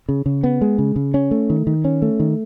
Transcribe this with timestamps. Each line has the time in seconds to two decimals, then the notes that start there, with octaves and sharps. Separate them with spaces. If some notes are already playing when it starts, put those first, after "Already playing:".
0.09 C#3
0.26 C#3
0.44 B3
0.61 G#3
0.78 C#3
0.96 C#3
1.14 C#4
1.31 A3
1.50 D#3
1.67 D#3
1.84 C#4
2.02 A3
2.20 D#3